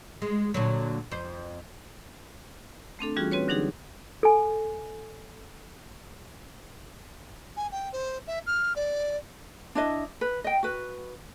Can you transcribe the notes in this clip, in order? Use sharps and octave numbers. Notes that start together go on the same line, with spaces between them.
G#3
A#2 D3 F#3
F2 C5
A3 C4 D4 A4
E3 G3 C#4 F4 F#4 G#4
C4 F#4 B4 C#5
D3 F#3 D4 D#4 G4 G#4
A4 G#5
G#5
G5
C5
E5
F6
D5
D4 E4 D#5
B4
D#5 G5
F#4 B4